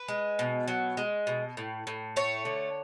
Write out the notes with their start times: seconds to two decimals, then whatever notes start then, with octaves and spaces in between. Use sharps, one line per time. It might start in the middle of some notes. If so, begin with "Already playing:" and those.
Already playing: B4
0.08 G#3
0.39 B2
0.68 F#3
0.97 G#3
1.27 B2
1.57 A2
1.87 A2
2.16 A3 C#5
2.45 D3